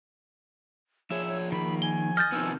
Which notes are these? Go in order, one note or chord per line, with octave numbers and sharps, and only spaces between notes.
F3 G#4 C#5 E5
C#5
D#3 A#3 B5
G#5 G7
D#5 F6 G6 A6
C3 D#3 F3 B3 E6